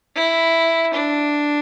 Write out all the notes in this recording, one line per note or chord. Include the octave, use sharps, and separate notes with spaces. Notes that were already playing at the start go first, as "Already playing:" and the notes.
E4
D4